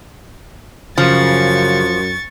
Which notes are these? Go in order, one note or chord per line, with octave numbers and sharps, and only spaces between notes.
F#2 C#3 F3 C#6 A6